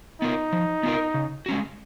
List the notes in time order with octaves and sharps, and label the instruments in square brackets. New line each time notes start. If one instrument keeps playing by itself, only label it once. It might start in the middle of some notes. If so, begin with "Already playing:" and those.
[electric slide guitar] B3 F4 A#4 [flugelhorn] D#4
[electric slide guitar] F3
B3 F4 A#4
C#3
G#3 C#4 F#4